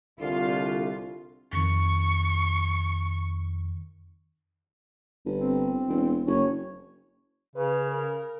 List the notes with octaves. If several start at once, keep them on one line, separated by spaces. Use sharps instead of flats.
C2 D3 F4
F2 D#3 C#6
G1
C4
E1
F#1 C#5
C#3 B4
A#4